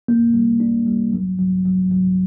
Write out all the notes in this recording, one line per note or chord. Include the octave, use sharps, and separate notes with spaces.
A#3
G3
D4
G3
F#3
F#3
F#3
F#3